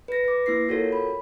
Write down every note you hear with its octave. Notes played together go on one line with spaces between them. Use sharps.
B4 A#6
B4 D6
A#3 E4 A#6 C7
F4 F#4 A4 A#4 C#5
B5